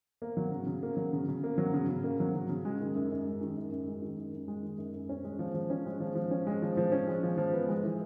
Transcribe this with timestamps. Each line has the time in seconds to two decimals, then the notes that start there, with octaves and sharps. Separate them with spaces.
0.22 A#3
0.37 F#3
0.52 C#3
0.66 C#3
0.83 A#3
0.97 F#3
1.13 C#3
1.28 C#3
1.44 A#3
1.58 F#3
1.74 C#3
1.89 C#3
2.04 A#3
2.20 F#3
2.35 C#3
2.49 C#3
2.65 G#3
2.81 D#3
2.95 F#2
3.11 F#2
3.27 G#3
3.41 D#3
3.57 F#2
3.72 F#2
3.87 G#3
4.02 D#3
4.17 F#2
4.33 F#2
4.48 G#3
4.63 D#3
4.78 F#2
4.93 F#2
5.09 C#4
5.24 G#3
5.39 F3
5.54 F3
5.70 C#4
5.86 G#3
6.00 F3
6.15 F3
6.31 C#4
6.47 G#3
6.62 F3
6.77 F3
6.92 C#4
7.08 G#3
7.23 F3
7.37 F3
7.53 B3
7.68 G#3
7.83 E3